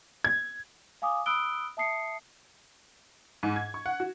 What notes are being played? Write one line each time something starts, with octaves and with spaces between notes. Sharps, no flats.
G#6
F5 G#5 D6 D#6
B5 D#6 E6 F#6 D7 G7
E5 A5 D#6 C7 C#7
G#2
G#6
C#6
F#5
F#4